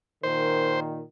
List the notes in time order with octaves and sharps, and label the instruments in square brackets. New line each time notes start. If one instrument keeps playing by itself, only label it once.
[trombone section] A#2 D#3 [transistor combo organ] C5